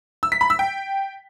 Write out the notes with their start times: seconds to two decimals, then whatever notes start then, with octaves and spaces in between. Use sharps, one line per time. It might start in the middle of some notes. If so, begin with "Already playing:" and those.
0.23 E6
0.32 B6
0.41 B5
0.50 E6
0.59 G5